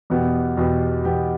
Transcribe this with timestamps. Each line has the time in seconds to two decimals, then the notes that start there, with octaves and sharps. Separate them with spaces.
0.10 E2 B2 B3 G4
0.57 E2 B2 B3 G4
1.04 E2 B2 B3 G4